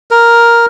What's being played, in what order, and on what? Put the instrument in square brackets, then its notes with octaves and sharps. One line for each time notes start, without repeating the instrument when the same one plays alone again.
[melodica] A#4